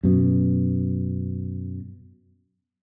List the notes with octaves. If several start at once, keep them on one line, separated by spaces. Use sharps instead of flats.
F#2 B2